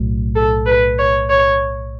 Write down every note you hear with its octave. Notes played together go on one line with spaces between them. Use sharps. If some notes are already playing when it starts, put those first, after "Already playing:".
Already playing: B1 A2 F#3
A4
B4
C#5
C#5